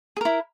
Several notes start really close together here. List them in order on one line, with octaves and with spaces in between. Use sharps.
G#4 A#4 E4